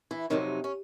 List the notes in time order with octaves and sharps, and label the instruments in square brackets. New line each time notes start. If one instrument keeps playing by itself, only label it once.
[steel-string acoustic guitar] E3 E4
F2 C3 D#3 F#3 D#4
C#4